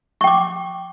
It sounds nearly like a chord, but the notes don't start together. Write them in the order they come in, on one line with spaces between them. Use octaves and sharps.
C#6 G5 D6